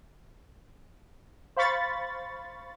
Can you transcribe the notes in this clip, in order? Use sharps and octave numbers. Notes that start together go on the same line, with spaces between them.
C5 F5 B5 C#6 A6